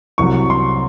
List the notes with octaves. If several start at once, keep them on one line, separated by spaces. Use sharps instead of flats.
C2 C3 F#3 C#6
C6